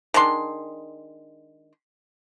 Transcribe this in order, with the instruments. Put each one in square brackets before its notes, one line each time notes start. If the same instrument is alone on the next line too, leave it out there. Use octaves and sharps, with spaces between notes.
[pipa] D#3 G#3 D4 C6